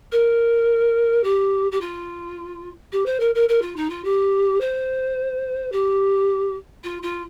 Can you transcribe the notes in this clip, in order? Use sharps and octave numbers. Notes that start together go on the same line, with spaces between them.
A#4
G4
G4
F4
G4
C5
A#4
A#4
A#4
F4
D#4
F4
G4
C5
G4
F4
F4